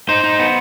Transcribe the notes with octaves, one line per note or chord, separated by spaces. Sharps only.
D#4 C5
D#4
B3